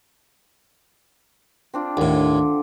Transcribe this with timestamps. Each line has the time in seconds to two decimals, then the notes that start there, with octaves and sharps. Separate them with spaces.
1.74 C4 D4 F4
1.97 D#2 A2 D3